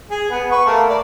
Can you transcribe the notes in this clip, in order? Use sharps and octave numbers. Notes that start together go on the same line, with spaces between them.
G#4
B3
B4 C#6
A3 A#3
D5